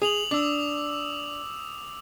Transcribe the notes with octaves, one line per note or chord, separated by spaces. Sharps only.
G#4 D#6 F7 F#7
D4 D6 E6